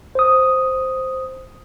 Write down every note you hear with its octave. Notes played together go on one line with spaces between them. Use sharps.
C5 D#6